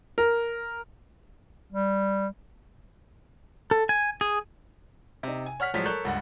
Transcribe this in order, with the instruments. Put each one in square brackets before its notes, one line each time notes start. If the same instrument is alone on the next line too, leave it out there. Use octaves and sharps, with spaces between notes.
[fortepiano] A#4
[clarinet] G3
[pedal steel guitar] A4
G#5
G#4
[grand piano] C3 D#4
G#5
C#5 F#5 F6 B6
A2 F3 F#3 G#3 C#5 B6
A4 A#4 C#5 C#6 F#6 G6
C#2 G2 F#5